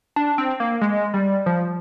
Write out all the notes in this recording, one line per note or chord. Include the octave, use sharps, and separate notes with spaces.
D4
C4
A#3
G#3
G3
F3